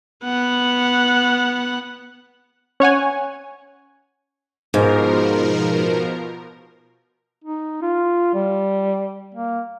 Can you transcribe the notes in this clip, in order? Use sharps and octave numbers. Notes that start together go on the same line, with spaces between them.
B3 F#5
C#4 C#5 F#5 G#5
G#2 B2 F3 A#4
D#4
F4
G3
A#3